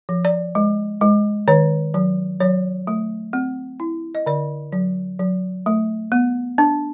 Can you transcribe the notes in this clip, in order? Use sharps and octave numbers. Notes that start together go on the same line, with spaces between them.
F3
D5
G#3
G#3
D#3 C#5
F#3
F#3 C#5
A3
C4
E4
D#5
D3 D5
F#3
F#3
A3
B3
D4